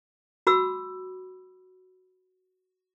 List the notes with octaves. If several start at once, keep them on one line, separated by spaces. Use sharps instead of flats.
F#4 B5 D6 E6